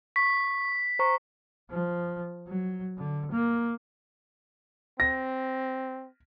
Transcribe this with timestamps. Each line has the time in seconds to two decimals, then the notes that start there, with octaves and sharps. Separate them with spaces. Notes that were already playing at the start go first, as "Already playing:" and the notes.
0.16 C#6 B6
0.99 C5 A#5 C#6
1.71 F3
2.47 F#3
2.98 D3
3.31 A#3
5.00 C4 A#6